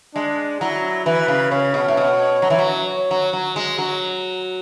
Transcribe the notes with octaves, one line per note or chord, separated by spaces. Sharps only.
G#3 D4
F#3 E4
E3 B4
C#3
C#3 C#5
B2
A2
B2
F#3
E3
F#3
C#5
F#3
F#3
G#3
F#3